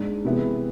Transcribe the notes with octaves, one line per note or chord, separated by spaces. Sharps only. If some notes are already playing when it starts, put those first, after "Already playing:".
Already playing: G#2 G#3 D4
C3 E3 G#3 B3 E4